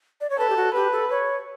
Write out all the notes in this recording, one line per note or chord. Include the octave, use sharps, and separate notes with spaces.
D5
C#5
A4 B4
G4
F#4
G4 B4
A4
C#5